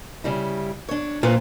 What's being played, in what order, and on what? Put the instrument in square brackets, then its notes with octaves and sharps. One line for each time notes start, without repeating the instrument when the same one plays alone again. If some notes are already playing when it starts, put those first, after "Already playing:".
[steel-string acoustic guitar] C#3 G3 E4
D4 C#5
[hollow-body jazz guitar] A#2 [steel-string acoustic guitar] F4 B4 C5